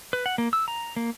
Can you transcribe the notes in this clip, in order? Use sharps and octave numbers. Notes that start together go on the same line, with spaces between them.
B4
F#5
A#3
E6
A#5
A#3